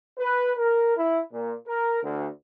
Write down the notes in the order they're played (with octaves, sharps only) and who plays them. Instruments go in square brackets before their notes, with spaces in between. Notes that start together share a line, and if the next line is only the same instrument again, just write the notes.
[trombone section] B4
A#4
E4
A#2
A#4
D2